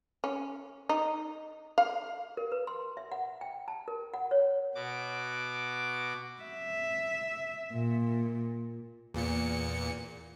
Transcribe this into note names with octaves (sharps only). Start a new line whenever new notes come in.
C#4
D#4
F5
A#4
B4
C6
E5
F#5
G5
A5
A#4
F#5
C#5
B2 F#4 D6
E5
A#2
E2 A#2 C#7